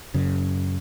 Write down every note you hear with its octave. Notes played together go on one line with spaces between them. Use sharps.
F#2 C#3